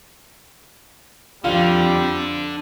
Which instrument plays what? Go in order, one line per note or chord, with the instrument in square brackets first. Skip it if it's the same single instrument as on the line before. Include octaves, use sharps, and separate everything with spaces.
[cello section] F2 [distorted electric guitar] D3 [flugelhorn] G3 [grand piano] F4 F7